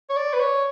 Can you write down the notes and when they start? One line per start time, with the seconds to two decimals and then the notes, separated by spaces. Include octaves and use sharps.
0.10 C#5
0.17 D5
0.33 B4
0.40 C#5